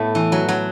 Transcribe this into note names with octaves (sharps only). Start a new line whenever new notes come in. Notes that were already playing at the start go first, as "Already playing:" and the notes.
Already playing: A2 A3 B3
E3
F#3
F#3